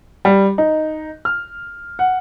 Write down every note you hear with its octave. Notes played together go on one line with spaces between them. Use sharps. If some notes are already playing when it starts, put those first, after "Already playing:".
G3
D#4
F6
F#5